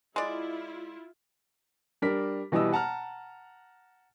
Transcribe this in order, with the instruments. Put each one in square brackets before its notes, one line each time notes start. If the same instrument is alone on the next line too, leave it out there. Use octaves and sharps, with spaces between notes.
[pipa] G#3 D5 [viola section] E4 F4
[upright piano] G3 D4 A#4 B6
B2 E3 G3 D#5 D#6 E6
F#5 A5 A#5 F6